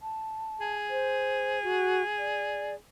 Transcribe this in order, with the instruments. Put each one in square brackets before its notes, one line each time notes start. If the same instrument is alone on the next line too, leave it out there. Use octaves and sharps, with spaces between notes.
[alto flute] A5
[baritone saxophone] G#4
[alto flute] C5
F#4
D5